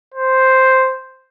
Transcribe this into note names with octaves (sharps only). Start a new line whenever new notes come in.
C5